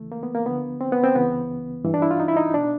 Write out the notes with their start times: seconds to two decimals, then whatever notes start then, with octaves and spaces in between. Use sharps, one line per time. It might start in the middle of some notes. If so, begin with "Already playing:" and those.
Already playing: D#2 C#3 E3 A3
0.12 A#3
0.23 B3
0.35 A#3
0.46 D2 D3 F3 B3
0.81 C4
0.92 B3
1.04 C4
1.15 C#2 C#3 E3 B3
1.85 G2 E3
1.94 D4
2.02 E4
2.11 F4
2.20 D#4
2.28 E4
2.37 D#4
2.54 B2 D4